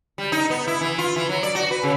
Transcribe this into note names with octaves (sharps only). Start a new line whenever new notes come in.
G3
D#4
B3
E4
E3
F4
E3
F#3
D5
F#4
B4
C#3